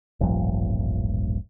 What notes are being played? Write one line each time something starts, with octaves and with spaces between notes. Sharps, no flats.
D#1 A1 G2 F3